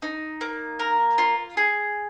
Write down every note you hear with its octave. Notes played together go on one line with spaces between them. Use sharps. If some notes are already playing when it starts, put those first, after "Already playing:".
D#4
A#3
A#4
F4
G#4